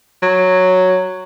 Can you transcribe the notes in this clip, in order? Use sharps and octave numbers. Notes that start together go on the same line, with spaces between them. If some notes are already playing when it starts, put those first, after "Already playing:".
F#3